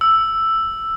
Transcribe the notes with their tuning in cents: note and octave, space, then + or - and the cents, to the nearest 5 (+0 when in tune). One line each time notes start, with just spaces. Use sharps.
E6 +5